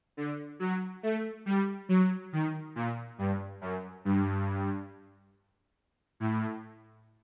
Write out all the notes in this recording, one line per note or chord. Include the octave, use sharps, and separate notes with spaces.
D3
F#3
A3
G3
F#3
D#3
A#2
G2
F#2
G2
A2